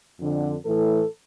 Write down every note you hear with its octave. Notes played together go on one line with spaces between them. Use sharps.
F2 D3
A2 E3 A4